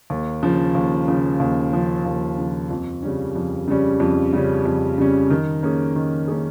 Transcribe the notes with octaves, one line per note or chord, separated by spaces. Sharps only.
D#2
C#3 F3
D#2
C#3 F3
D#2
C#3 F3
D#2
C#3 F3
F2
C#3 G3 C#4
F2
C#3 G3 C#4
F2
C#3 G3 C#4
F2
C#3 G3 C#4
D#3
A#3 C#4 G#4
D#3
A#3 C#4 G#4